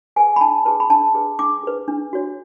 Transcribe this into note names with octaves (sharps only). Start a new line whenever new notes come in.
G#4 B4 G#5
B5
D4 A5
G#4 B4 A5
B5
D4 A5
G#4 B4
D4 D6
G#4 B4
D4
F#4 C#5